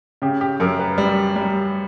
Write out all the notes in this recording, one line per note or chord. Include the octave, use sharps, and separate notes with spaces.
C#3 G4
G4
F#2 A#4
B4
G3
G3